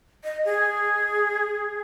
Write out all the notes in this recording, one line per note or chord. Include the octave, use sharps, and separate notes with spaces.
D#5
G#4